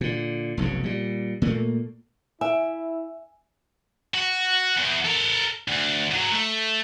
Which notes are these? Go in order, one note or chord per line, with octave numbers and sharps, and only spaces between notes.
A#2 D3
F1 B1 G2 C#3
A#2 G3
A#2 A3 A#3
E4 E5 G#5
F#4
E2
A4 A#4
D2
G#2 F#3
A3